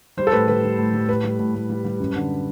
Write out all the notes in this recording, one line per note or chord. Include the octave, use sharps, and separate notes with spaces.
G3 C5
A4
A2 B4
G3 B4
G3
A2
G3
A2 B4
G3
A2
A2
G3
G3
F#2
D3